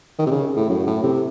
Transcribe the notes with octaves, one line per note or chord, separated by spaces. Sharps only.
D#3
C3
C#3
A2
F#2
A2
C3